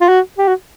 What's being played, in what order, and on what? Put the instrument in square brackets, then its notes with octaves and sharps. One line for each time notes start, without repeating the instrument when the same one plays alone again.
[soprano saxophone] F4
F#4
G4
F#4